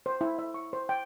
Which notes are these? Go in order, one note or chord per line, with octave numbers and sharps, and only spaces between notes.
C5
E4
E5
C#6
C5
G5